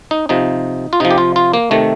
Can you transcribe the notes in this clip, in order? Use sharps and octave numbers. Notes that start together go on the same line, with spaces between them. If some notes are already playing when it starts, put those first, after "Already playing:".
D#4
C3 F3 D#4
F4
C3 F3 D#4
G4
F4
F4
A#3
C3 D#3 A3